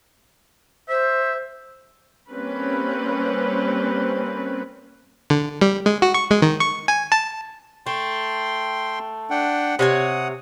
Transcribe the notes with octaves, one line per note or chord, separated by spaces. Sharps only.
C5 E5
G3 A#3 C4 C#4 B4
D3
G3
G#3
F#4
C#6
G#3
D#3
C#6
G#5
A5
A3 G5 C6
D4 F#5 G5
C3 C#5 F#5 G#5 D#6